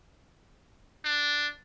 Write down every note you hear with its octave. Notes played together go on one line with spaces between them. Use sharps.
D4